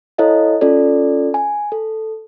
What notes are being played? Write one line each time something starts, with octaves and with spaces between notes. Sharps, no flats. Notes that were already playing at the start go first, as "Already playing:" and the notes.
E4 A4 C#5 D#5 F5
C#4 F4 A4 D5
G#5
A4